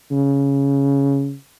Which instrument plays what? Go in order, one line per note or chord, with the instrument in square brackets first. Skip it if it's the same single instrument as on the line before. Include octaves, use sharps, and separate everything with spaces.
[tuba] C#3